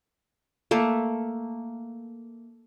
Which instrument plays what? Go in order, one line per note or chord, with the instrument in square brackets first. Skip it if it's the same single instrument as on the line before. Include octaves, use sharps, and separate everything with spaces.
[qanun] A3 A#3